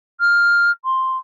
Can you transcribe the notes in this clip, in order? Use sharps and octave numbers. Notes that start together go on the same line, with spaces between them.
F6
C6